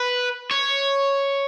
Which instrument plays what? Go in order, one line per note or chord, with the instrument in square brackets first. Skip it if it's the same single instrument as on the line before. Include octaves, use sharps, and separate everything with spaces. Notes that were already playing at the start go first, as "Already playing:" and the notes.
Already playing: [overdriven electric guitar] B4
C#5